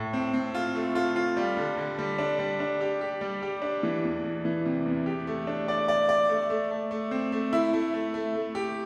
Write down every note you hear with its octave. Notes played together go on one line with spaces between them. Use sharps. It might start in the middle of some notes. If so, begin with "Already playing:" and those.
Already playing: A2
C4
C4
F4
A3
F4
F4
G3
D3
D3
G3
D4
G3
D4
G4
G4
G3
G4
D4
E3
E2
E3
E3
C3
E2
G4
A3
D4
D5
D5
D5
A3
A3
A3
A3
C4
A3
E4
A3
A3
A3
A3
G4